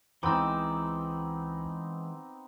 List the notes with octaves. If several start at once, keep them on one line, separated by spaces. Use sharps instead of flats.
C#2 E3 G#3 B3 C4 D#4 D6 E6